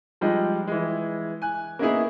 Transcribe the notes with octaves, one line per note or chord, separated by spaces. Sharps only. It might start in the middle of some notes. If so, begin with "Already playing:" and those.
F3 G3 G#3 D#4
E3 G#3
G#5 F#6
A#3 B3 C#4 D#4 E4 G#4